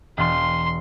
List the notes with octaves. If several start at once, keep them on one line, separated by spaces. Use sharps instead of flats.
E1 C6 F6 A6